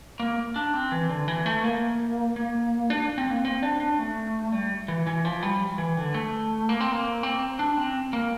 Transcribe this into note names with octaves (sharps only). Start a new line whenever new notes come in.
A#3
D4
C4
E3
D3
E3
A3
A#3
A#3
D4
C4
A#3
C4
D4
D4
A3
G3
E3
E3
F3
G3
E3
D3
A3
A#3
C4
A#3
C4
D4
C4
A#3